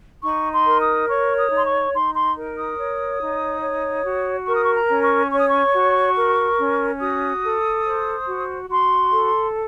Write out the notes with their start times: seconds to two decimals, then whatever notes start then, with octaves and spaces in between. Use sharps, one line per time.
0.23 D#4 C#6
0.52 C6
0.65 A#4
0.80 D#6
1.08 C#5 C#6
1.37 D#6
1.50 D#4
1.57 C6
1.64 C#6
1.92 D#4 C6
2.14 C6
2.35 A#4
2.56 D#6
2.78 C#5
3.19 D#4
3.61 C#5
4.05 F#4
4.47 A#4 C#6
4.56 D#6
4.65 C#6
4.75 A#5
4.89 C#4
5.03 C#6
5.31 C#5 C#6
5.40 D#6
5.48 C#6
5.73 F#4
6.16 A#4
6.59 C#4
7.00 F#4 D#6
7.43 A4
7.84 C5
8.28 F#4
8.70 F#4 C6
9.12 A4